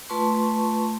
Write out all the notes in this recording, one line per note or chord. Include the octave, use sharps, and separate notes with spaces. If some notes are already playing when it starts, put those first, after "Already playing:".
A3 F4 B4 A5 C6 C#6